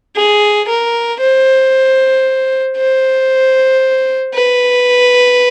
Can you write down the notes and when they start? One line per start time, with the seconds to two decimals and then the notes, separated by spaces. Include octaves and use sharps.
0.15 G#4
0.68 A#4
1.20 C5
2.77 C5
4.34 B4